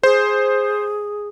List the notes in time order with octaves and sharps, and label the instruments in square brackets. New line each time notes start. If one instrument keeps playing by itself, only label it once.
[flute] G#4 [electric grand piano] C5